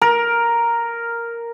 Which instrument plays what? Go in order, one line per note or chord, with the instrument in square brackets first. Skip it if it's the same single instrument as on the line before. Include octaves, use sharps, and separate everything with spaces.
[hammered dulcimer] A#4